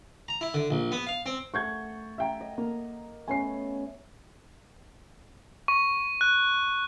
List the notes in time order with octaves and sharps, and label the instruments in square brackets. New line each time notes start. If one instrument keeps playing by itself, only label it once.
[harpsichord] A#5
E4
D3
A#1
B3
F5
C4
[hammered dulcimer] A3 F#5 A5 [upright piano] C#6 G6 G#6
[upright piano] E5 G5 A#5
[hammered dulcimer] D#5
[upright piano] A#3 [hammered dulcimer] A#5
[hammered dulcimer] A3 B3 C#4 [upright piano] G#5 C7
[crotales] C#6
F#6